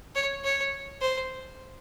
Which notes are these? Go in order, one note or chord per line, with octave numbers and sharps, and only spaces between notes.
C#5
C#5
C5